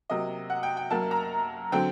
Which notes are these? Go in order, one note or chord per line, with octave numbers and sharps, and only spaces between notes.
C3 F#3 A#3 D#5
F#5
G5
G5
F#2 F#3 A#3 A5
A#5
D3 F#3 C4 G5